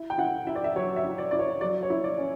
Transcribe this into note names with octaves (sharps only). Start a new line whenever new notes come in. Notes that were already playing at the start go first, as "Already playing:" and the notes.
Already playing: E4
G5
E4 F#5
E4 E5
D5
E5
F#3 C#5
E5
E4
D5
E4 D5
C#5
F#3 D5
C#5
E4
D5
C#4